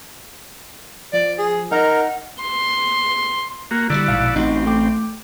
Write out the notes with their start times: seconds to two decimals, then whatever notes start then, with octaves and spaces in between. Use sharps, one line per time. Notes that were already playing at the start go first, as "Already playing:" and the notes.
1.13 F3 D5
1.39 G#4
1.72 D#4 A#4 F#5
2.42 C6
3.71 A#3 F#4
3.90 D3 F#3 G3 E4 F#4 D5
4.08 A#1 G#2 B2 F5
4.36 A1 C4 D#4 F#4
4.66 A3 G5 D6